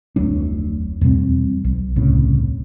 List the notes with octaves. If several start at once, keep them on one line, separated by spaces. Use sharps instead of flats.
F1 D2 F#3 D4
E2 B2 G3 C4
B1
D#1 C2 A2 C#3